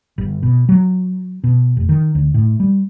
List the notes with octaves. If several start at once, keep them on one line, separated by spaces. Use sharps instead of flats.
G1
B2
F#3
B2
F1
D#3
D2
A2
G3